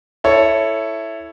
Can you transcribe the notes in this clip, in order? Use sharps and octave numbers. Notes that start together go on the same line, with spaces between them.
E4 A4 C#5